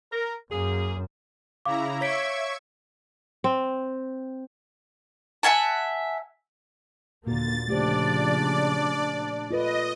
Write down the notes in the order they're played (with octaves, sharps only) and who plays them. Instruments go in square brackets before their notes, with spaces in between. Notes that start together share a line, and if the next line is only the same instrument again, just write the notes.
[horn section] A#4
[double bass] F#2 [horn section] A#3 G#4
[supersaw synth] C#3 E4 A#5 [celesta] F5 D6
[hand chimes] C#5 B6 D7 [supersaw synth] E5 C#6 G#6
[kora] C4
[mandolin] E5 F#5 G#5 A5
[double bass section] D#2 D3 A#3 [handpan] A#2 F#4 [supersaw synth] A6
[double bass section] A#2 C#3 F3 [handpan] A3 G4 C5 [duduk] D4 [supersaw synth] D5
[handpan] F4 A4 B4 [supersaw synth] D#5